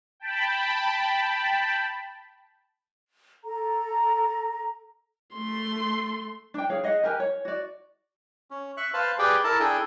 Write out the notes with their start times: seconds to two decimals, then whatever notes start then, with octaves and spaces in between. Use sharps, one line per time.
0.20 G5 A5 B5
3.44 A4 A#5
5.34 A3 C6
6.54 D4 G5
6.70 G#4 C#5 F5
6.84 G#4 D#5 F#5
7.03 G4 A#4 B4 G#5
7.20 C#5
7.45 F#4 D5
8.51 C#4
8.77 E5 C#6 F#6
8.94 B4 C5 F5 A5
9.19 G4 G#4 B4 D5 G5
9.44 E4 A4 A#4 A5
9.60 D4 E4 G#4 A4 G5 G#5